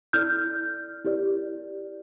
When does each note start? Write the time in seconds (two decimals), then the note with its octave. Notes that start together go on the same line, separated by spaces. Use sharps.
0.13 E4 A4 D5 F6 G6
1.05 E4 G4 A#4 D5